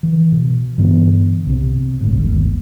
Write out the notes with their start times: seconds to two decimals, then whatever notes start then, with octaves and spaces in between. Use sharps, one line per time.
0.03 E3
0.32 B2
0.78 G2 D3 E3 B3
1.46 C2 C3
2.01 G1 D2 A2
2.17 G1 D#2